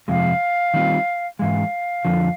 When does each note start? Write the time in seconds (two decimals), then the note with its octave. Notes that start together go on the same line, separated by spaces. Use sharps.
0.08 F2 C3 F3 G#3 F5
0.74 D#3 G3 C4 F4
1.39 G#2 E3 G#3 F5
2.05 F2 D3 F3